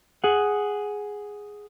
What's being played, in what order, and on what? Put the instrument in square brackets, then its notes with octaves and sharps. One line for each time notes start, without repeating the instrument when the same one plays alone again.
[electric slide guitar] G#4 F#5